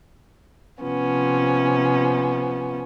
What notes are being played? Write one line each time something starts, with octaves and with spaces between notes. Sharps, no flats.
C3 F3 B3 C#4